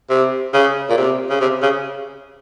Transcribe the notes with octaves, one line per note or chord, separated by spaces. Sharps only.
C3
C#3
A#2
C3
C#3
C3
C#3